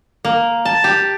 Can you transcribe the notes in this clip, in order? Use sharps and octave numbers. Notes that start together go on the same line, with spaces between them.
A#3
A5
G4